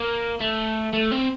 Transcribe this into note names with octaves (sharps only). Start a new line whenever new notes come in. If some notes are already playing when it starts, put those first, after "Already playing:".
Already playing: A#3
A3
A3
C4